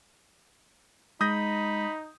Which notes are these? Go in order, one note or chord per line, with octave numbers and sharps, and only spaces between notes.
G#3 D#4 B5 D#6 G6 A#6